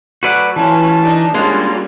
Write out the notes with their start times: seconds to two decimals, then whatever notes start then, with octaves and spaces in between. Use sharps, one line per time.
0.23 F#3 A3 F#4 B4 D5
0.56 E3 C#4 F4 B4 A5
1.03 D4 D#4
1.34 G3 G#3 A#3 C#4 D4 F4 F#4